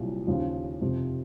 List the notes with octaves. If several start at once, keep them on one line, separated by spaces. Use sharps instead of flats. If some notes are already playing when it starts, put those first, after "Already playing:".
Already playing: C2 A#2 F#3
D#2 C#3 F3
F2 C3 F3